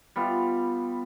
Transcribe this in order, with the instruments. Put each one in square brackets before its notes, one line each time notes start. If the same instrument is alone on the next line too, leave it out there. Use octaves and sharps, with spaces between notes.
[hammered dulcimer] G3 B3 F4